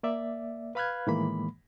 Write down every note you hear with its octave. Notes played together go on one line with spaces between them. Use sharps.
A#3 D5 E5
B4 F5 B5 F6 F#6 G#6
A2 D#3 E3 G#3 A#3 B5